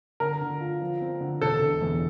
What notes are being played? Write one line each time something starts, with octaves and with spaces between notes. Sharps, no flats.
D3 A#4
D3
F4
F3
C4
D3
E1 A4
E1
E2